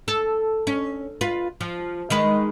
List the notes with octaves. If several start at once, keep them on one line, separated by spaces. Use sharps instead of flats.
A4
C#4
F4 B4
F3
D#3 G#3 B4